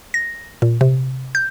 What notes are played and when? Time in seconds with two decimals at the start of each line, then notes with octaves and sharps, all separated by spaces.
0.14 A#6
0.62 A#2
0.81 C3
1.35 G6